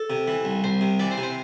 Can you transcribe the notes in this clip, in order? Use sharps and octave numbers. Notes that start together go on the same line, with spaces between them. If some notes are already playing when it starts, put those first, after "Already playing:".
Already playing: A4
C3
E3
C2
C2 C5
C3
E3 D5
C5
C3
C5